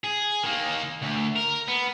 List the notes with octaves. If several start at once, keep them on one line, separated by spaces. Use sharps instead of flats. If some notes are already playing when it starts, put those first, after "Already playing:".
G#4
D#3 A#3
D2
A#4
B3